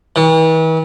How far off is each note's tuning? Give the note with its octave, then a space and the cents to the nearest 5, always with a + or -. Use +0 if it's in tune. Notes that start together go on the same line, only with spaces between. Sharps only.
E3 -40